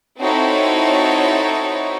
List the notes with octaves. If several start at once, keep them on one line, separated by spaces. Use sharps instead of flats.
C4 D#4 E4 F#4 A4 C#5